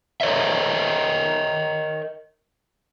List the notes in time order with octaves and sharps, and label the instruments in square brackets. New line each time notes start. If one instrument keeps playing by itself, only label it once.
[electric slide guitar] A#4 C#5 D#5 E5